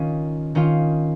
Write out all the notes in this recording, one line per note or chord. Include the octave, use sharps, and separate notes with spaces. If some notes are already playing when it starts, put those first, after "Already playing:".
Already playing: D#3 C#4 F4
D#3 C#4 F4